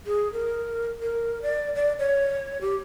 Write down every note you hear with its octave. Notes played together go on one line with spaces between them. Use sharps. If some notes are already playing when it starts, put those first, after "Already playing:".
G#4
A#4
A#4
D5
D5
C#5
G4